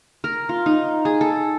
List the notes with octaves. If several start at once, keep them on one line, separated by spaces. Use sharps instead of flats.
A#4
F4
D#4
G#4
A4